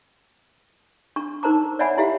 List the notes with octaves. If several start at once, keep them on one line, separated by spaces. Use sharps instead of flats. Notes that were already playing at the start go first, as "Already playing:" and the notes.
D4 C#6
D#4 A#4 C5 A5 A#5 D6
C#5 D5 E5 F#5 G#5 B5
E4 G4 E5 F5